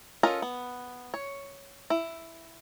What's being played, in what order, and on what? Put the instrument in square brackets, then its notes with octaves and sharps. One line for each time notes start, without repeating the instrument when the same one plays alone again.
[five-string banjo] C#4 F4 A4 A#4 D#5
B3
C#5
E4